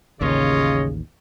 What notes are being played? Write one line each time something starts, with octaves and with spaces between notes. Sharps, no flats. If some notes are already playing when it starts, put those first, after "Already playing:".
A1 D#2 C#3 F4 C#5 D#5